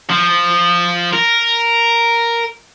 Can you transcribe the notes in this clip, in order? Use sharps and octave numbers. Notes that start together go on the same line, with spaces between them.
F3
A#4